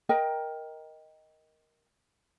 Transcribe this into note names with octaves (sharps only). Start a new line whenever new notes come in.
A#4 D#5 G5